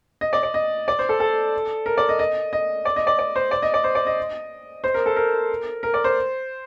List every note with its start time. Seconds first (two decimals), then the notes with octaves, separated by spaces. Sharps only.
0.21 D#5
0.33 D5
0.43 D5
0.54 D#5
0.88 D5
0.99 C5
1.09 A4
1.20 A4
1.86 A#4
1.97 D5
2.09 D#5
2.19 D#5
2.53 D#5
2.85 D5
2.96 D#5
3.07 D5
3.19 D5
3.36 C5
3.51 D5
3.62 D#5
3.74 D5
3.84 C5
3.95 D5
4.07 D#5
4.84 C5
4.94 A#4
5.06 A4
5.16 A#4
5.83 A#4
5.94 D5
6.04 C5